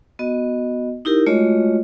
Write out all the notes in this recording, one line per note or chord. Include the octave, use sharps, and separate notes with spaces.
B3 F#4 D#5
D#4 E4 G4 A#4
G#3 A3 F4 F#4 C#5 D#5